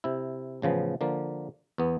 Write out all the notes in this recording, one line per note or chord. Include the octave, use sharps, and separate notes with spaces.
C3 E4
A1 C#3 F3 B3
D3 F3 A#3
E2 B3